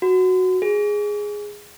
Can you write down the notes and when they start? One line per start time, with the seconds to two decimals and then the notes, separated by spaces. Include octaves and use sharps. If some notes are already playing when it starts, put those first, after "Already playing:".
0.02 F#4
0.62 G#4